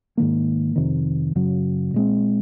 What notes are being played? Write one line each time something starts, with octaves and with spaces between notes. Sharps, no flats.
G#2 D#3 A#3
F2 C3 D#3
F#2 C#3 F#3
A#2 G#3 C4